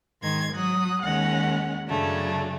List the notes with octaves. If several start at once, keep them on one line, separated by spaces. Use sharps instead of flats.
G#2 D#3 C6 G#6
F#3 D#6 F#6
D#2 D#3 G#3 C#4 F#5
F#2 C#3 F#3 A3 D4